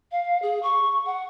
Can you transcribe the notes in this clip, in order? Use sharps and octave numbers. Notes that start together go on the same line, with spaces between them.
F5
G#4
C#6
F#5